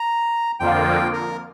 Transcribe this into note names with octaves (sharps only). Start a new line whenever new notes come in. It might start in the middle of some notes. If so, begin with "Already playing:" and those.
Already playing: A#5
F2 D3 F3 A#3 F4 G5
A#4